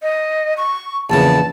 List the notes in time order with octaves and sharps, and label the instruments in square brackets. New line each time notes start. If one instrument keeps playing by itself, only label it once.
[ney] D#5
C#6
[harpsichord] A#1 E2 C#3 [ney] A5